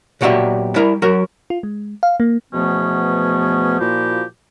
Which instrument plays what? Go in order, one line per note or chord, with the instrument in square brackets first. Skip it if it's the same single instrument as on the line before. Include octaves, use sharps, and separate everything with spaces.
[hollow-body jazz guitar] B1 A#2 F#4 G4 D5 E5
G3 E4 A#4
F#3 F#4 A#4
[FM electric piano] F4
G#3
F5
A#3
[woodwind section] E2 B2 F3 A3 B3 C#4
A#2 F3 A#3 E4 F#4 G4